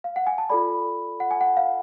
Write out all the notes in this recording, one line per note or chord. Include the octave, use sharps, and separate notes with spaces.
F5
F#5
G#5
A5
F4 A4 D5 B5
F#5
G#5
F#5
F5